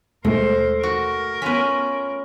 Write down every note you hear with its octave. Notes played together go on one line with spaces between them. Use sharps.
D#2 B2 G#3 A3 A#4 C5
F#4 A#4
B3 C#4 F4 B4 B6